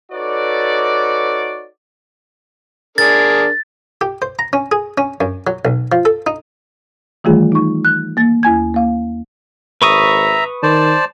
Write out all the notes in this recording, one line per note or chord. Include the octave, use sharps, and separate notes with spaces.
D#4 F#4 A4 B4 C#5 D5
D4 G#4 A#4 A6
G4
C5
A#5
C#4
G#4
C#4
F#2
F#3
B1
F3
A4
D#4
D#3 E3 G3 A3 F4 G#4
D#4 C#6
F#6
A#3 A6
D#2 E4 G#5 G#6
A#3 F5
G#1 B4 E5 A#5 C#6 D#6
D#3 C5 D5 A5